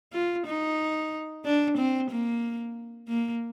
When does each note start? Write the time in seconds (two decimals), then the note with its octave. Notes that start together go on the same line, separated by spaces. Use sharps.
0.13 F4
0.47 D#4
1.45 D4
1.78 C4
2.11 A#3
3.09 A#3